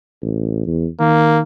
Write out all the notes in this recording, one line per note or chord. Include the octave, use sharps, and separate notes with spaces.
A1
E2
D#3 A#3